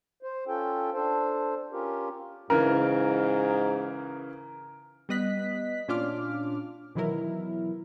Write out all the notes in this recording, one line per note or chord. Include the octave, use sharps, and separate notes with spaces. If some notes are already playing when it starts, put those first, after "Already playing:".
C5
C#4 F4 A4 G5
D4 A4 C5
C#4 F4 G4 A#4
G#2 C#3 E3 A#4
G3 B3 D#5 F#6 B6
A#2 C#4 D4 F4 D6 F6
B2 D#3 E3 F#3 E4 A#4